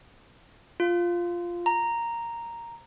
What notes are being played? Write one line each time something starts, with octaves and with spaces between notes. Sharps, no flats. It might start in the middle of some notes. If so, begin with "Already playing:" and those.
F4
A#5